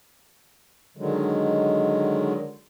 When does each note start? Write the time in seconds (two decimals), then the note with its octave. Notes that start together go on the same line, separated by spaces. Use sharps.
0.97 D3 D#3 F#3 G#3